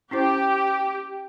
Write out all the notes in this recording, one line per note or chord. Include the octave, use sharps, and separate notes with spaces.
C#4 E4 G4 C5